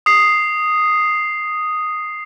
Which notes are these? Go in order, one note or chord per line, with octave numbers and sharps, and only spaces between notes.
D#6 C7